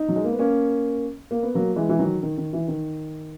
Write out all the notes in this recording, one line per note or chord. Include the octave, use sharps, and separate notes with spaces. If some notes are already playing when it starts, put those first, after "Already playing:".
Already playing: D#4
F#3
G#3
A#3
B3
A#3 C#4
A#3
B3
F#3 A#3
E3 G#3
E3
D#3 F#3
D#3
D#3
E3
D#3